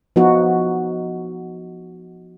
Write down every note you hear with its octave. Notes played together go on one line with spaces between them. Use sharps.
F3 B3 D#4 F#4